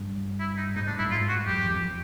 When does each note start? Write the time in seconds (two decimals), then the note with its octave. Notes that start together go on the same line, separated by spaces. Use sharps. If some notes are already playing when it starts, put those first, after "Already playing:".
Already playing: G2
0.40 E4
0.57 D#4
0.75 G#2 D#4
0.87 A2 D4
0.99 G2 E4
1.11 G#2 F4
1.29 F#4
1.46 F#2 G4
1.58 F2
1.70 F2